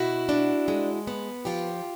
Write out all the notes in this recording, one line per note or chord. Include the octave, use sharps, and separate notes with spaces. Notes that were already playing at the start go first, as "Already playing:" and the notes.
Already playing: B2 E4 F#4
D4
G#3
B3
F3 F4 G4